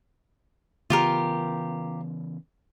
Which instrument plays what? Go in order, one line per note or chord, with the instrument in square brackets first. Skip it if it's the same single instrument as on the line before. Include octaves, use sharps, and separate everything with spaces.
[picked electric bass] C#3 E3 B3 [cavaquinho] F4 G4 A#4